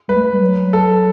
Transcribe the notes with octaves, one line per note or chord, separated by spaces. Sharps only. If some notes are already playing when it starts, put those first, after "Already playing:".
G3 B4
A3
G3
F#3
A4